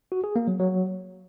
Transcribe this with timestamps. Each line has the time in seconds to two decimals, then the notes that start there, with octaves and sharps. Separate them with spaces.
0.12 F#4
0.24 G#4
0.36 A#3
0.48 F#3
0.59 F#3